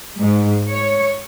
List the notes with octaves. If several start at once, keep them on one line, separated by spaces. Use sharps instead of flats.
G#2
C#5